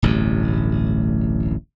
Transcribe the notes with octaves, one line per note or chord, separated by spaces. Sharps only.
D1 A1 G2